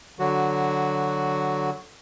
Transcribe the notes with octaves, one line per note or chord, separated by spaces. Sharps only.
D3 F#3 F#4